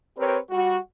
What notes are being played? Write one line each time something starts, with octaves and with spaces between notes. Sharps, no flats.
C4 G4 A#4 B4 C#5
G3 F#4